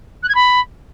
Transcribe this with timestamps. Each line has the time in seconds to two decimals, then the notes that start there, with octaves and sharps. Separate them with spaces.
0.23 F#6
0.29 G#6
0.35 B5